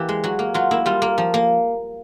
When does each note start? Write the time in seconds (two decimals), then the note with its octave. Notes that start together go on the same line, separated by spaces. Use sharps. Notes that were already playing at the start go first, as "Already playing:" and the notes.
Already playing: E3 A#3 G4
0.09 G#3
0.24 F#3 F#4
0.39 A#3
0.54 F#3 F4
0.71 A#3 E4
0.86 G3 F4
1.02 A#3
1.18 F3
1.34 A#3